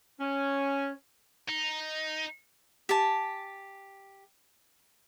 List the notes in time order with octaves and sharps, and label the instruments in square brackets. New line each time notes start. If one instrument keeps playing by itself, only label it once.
[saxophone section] C#4
[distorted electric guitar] D#4
[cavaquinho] G4 G#5 A5